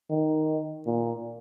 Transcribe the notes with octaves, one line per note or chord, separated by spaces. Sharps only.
D#3
A#2